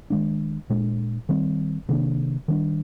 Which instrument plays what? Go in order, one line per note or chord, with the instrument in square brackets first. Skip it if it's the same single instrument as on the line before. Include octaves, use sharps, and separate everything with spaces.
[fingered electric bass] D#3 G#3 D4
A#2 G#3 D4
D#3 G3 C4
C3 D#3 A#3 D4
D#3 G3 D4